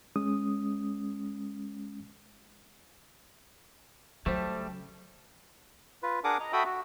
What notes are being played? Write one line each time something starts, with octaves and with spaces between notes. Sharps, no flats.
G#3 C#4 D#6
C#3 F#3 G3 A3 C5 G5 A5
F4 B4
D4 G#4 A#4 F#5 D6 D#6
D#5 A#5
F#4 A4 E5 G5 B5 D#6
F#4